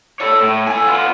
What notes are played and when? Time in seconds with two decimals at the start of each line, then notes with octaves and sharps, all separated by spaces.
0.20 A4 C#5
0.41 A2
0.67 A4 G#5
0.87 B3 F4